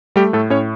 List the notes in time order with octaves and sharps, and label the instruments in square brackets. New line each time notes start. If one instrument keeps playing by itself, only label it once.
[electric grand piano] G3 A3 G4
A2 A3 A4
A2 C#4 C#5